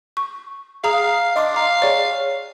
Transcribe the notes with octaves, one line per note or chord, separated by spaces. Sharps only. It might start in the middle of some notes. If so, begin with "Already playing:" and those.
C#6
G#4 F5 A#5 D#6
D4 D#5 C6 D6
F5 A#5
G#4 C#5 D5